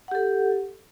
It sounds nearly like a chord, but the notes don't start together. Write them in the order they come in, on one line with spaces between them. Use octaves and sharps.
F#5 G4 A4